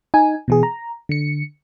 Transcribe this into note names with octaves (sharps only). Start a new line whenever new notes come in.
D#4 G#5
B2 E3 G#4
A#5
D3 C#7